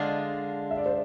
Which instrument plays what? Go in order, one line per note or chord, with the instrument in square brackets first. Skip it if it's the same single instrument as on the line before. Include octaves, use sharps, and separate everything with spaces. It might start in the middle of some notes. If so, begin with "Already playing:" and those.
Already playing: [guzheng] D3 G#3 D4 F4 [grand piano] D5
[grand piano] E5
D5
C5